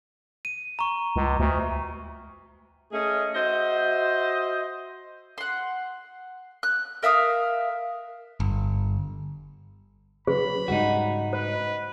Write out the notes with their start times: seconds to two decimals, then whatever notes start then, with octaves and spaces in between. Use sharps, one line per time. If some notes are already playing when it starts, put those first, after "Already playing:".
0.45 D#7
0.79 A#5 C#6
1.16 C#2
1.39 D2
2.93 A3 C#4 G#4 D#5
3.35 F#4 C5 D#5 E5
5.38 F#5 C6
6.63 F#6
7.03 A#4 E5 F5 D#6
8.40 G1
10.27 C#3 F#3 G#4 B4 C5 B5
10.68 G#2 C#3 G3 D#4 F#4
11.33 B4 C5